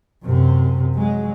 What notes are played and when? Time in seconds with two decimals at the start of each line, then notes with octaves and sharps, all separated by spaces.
0.23 F#2 C3
0.95 F#3 G#3